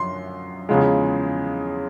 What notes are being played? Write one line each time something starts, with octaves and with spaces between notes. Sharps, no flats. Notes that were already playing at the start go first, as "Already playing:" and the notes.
Already playing: F#2 F3 C6
E2 C#3 F3 G#3